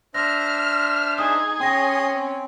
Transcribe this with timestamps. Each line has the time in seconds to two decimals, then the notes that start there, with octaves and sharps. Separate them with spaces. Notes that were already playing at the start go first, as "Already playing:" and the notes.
0.14 D4 C5 E5 F6 A#6
1.18 D#4 G#4 D#6
1.60 C#4 G5 C6 D#6 A#6
2.13 C4